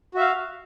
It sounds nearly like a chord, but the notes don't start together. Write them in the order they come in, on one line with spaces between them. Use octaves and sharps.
F#4 E5 F5